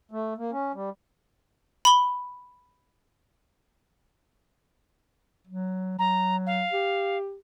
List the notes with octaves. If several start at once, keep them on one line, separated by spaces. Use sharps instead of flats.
A3
A#3
C#4
G3
B5 G7
F#3
F#3 A#5
F5
G4